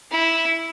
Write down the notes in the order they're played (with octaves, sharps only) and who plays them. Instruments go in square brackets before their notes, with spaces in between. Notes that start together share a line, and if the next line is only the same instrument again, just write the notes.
[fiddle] E4